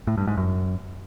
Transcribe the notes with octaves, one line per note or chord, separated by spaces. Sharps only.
A2
G2
G#2
F#2